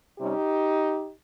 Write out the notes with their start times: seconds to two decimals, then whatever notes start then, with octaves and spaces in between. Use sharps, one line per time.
0.18 C3 G3 C#4 D#4 G4